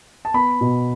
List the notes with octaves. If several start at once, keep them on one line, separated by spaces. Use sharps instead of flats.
A5
B3 B5
B2